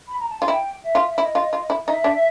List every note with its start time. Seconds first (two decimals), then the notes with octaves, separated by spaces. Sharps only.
0.08 B5
0.19 A#5
0.29 A5
0.39 F4 G#5
0.48 E4 G5
0.84 E5
0.95 F4
1.09 E5
1.17 E4 D#5
1.35 F4
1.53 F4
1.70 E4
1.87 D#4 E5
2.04 D4